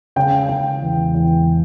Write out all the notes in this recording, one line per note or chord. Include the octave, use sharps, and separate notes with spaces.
C#3 G5
C#3 G5
E2
E2